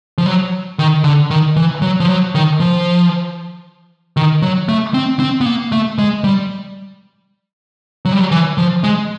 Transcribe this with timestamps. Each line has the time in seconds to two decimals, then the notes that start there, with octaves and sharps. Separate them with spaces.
0.18 F3
0.26 F#3
0.79 D#3
1.04 D3
1.30 D#3
1.56 E3
1.82 F#3
2.00 F3
2.09 F#3
2.35 D#3
2.60 F3
4.17 D#3
4.42 F#3
4.69 A3
4.94 C4
5.19 C4
5.41 B3
5.46 A#3
5.72 A3
5.98 G#3
6.24 G3
8.05 F#3
8.12 G3
8.21 F#3
8.31 E3
8.58 F3
8.84 G#3